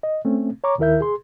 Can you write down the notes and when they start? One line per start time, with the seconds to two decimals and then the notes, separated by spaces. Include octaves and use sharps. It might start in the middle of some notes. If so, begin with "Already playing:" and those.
0.03 D#5
0.25 A3 C4 C#4
0.64 C#5 A#5 C#6 D6
0.78 D#2 D#3 E4 A#4 E5 G6
1.01 G#4 C6